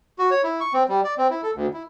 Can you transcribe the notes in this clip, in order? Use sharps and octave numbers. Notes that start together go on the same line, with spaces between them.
F#4
C#5
E4
C#6
C4
G3
D5
C4
E4
A4
D2
E4